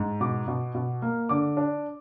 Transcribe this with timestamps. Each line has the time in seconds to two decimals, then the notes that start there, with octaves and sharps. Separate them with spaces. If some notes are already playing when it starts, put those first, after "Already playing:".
Already playing: G#2
0.21 B2 D6
0.48 B2
0.75 B2
1.02 A#3
1.29 D3 D6
1.57 D4